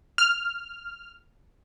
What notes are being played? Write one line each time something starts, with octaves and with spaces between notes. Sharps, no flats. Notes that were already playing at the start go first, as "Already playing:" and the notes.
F6